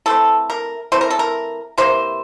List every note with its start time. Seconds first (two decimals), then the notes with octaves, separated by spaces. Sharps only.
0.06 E3 A3 C4 A4
0.50 A#4
0.92 E3 A3 C4 C5
1.01 A#4
1.10 A4
1.19 A#4
1.78 C3 E3 A#3 C5